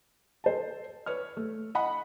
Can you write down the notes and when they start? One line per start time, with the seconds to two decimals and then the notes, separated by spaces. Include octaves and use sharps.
0.44 A4 C5 A5
1.06 B4 C#5 D5 F6
1.37 A3
1.75 D#5 F#5 B5